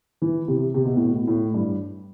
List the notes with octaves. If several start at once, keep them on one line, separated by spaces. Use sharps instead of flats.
E3
C3
C3
B2
A2
B2
A2
G2